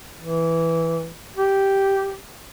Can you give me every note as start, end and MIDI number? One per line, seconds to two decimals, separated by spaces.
0.21 1.10 52
1.37 2.17 67